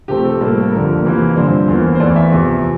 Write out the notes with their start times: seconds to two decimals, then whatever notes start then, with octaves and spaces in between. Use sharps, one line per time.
0.08 C3 F3 A3 C4 G4
0.25 A4
0.41 A2 G3 A#3 A4
0.72 F2 D3 F3 A#3 A#4
1.05 C3 E3 A#3
1.36 G2 D3 F3 C4 C5
1.68 E2 E3 A#3
1.95 C5
2.00 E2 E3 A3 D5
2.16 E5
2.32 E2 C3 F3